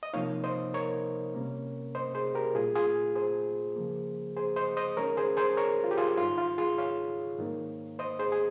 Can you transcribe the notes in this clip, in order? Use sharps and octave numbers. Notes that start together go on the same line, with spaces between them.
D#5
C3 F3 A#3 D#4 C#5 F5
C5 D#5
A#4 C#5
C3 G3 A#3 C#4
C5 D#5
G#4 C5
G4 A#4
A#2 G3 A#3 F4 G#4
F4 G#4
G#4 C5
C#3 F3 A#3
G#4 C5
C5 D#5
C5 D#5
D#3 G#3 C#4 A#4 C#5
G#4 C5
G#4 C5
A#4 C#5
F4
G4
F4 G#4
G#2 D#3 G3 F4
F4
F4 G#4
C#5 F5
G#2 D#3 A#3
C5 D#5
G#4 C5
G#4